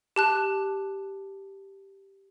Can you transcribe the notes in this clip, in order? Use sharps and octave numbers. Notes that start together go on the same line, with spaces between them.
G4 A5 F#6